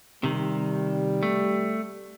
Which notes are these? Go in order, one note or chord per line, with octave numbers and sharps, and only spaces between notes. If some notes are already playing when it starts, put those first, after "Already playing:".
C3 D#3 G3
A3